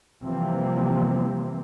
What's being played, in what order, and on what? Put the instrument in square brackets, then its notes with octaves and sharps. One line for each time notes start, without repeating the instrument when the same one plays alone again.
[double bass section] C3 E3 F3 G3 A#3 C4